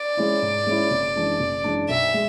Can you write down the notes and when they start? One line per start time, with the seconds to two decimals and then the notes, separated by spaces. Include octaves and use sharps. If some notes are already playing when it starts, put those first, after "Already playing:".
Already playing: D5
0.17 G#3 C#4 E4
0.42 G#2
0.66 G#3 C#4 E4
0.91 F#1
1.15 F#2 E3 G#3 D4
1.40 F#1
1.64 F#2 E3 G#3 D4
1.89 B1 E5
2.14 G#3